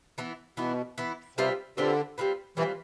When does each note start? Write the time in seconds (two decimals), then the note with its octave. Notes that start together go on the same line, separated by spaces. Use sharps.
0.18 E3 B3 E4
0.57 B2 E3 B3 E4
0.98 E3 B3 E4
1.37 C3 G3 C4 F4 B4
1.77 D3 G3 C4 F4 B4
2.18 G3 C4 F4 B4
2.57 E3 G3 C4 F4 B4